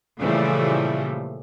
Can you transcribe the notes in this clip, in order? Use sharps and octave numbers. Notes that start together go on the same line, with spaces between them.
A#2 C#3 E3 F3 G3 A3